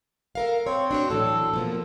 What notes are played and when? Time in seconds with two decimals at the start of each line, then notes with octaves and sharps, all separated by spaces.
0.35 A4 A#4 F5
0.67 C4 C#5
0.91 D4 F#4 C#5
1.10 A2 E3 F#3 A4
1.54 B2 F3 A#3